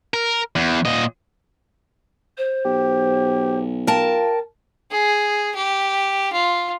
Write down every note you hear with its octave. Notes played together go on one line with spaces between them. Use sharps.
A#4
E2
A#2 D#5
C5
B1 G4
F4 A#4 G5 A5
G#4
G4
F4